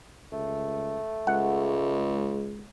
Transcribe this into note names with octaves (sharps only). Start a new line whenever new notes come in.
C#2 A3
C#2 G#3 F#5